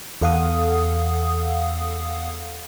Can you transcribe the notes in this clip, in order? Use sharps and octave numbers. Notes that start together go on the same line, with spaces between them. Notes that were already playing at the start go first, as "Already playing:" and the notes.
E2 A4 F5 F#5 D#6